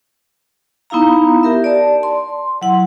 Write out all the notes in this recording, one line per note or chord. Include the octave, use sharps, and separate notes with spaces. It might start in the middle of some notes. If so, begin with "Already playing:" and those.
B3 D#4 E4 F5 A#5
G4 A#4 E5
D5 A5
C6
F#3 E4 F#5